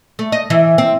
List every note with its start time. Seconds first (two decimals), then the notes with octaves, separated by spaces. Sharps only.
0.19 A3
0.32 D#5
0.50 E3
0.78 C4